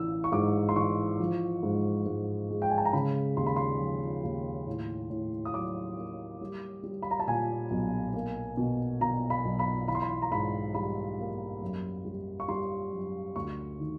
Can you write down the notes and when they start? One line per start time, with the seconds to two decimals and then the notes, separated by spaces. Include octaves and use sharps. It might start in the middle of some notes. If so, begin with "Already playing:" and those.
Already playing: A1 E3 E6
0.24 C#6
0.32 G#2 D6
0.69 C6
0.76 E3 C#6
1.20 F3
1.63 G#2
2.06 G#2
2.50 G#3
2.62 G5
2.70 G#5
2.78 A5
2.85 A#5
2.93 C#3 B5
3.36 D#2 C6
3.46 B5
3.56 C6
3.79 F3
4.23 D#2
4.67 A2
5.10 A2
5.45 D#6
5.53 F#3 D6
5.97 A#3
6.41 G3
6.83 G3
7.03 B5
7.11 A#5
7.20 A5
7.27 A#2 G#5
7.71 B1
8.14 A#3
8.57 B2
9.01 B2 A#5
9.30 B5
9.45 B1
9.59 B5
9.88 E3 B5
9.95 C6
10.02 B5
10.22 A#5
10.31 G#2 B5
10.74 G3 B5
11.19 A#3
11.62 F#2
12.05 G3
12.40 C#6
12.48 G3 C6
12.93 F#2
13.36 D2 C#6
13.79 D#3